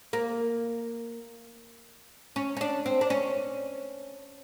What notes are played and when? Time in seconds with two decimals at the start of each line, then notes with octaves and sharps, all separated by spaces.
0.13 A#3
2.36 C#4
2.57 C#4
2.61 D4
2.86 C4
3.01 D4
3.10 C#4